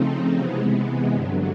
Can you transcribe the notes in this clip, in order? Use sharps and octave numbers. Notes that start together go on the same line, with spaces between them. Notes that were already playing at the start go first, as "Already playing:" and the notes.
Already playing: C#3 F3 A3 C4 D#4
C3 E3 G#3 B3
G2 D3 F#3